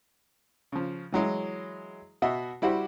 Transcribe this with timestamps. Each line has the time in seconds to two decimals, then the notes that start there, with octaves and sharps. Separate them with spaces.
0.72 C#3 F3
1.12 E3 F#3 G#3 E4
2.22 B2 F#4 D#5 E5
2.62 G3 E4 F#4 G4 C5